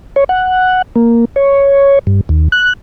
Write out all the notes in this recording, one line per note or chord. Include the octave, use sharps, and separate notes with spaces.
C#5
F#5
A#3
C#5
G2
D#2
F#6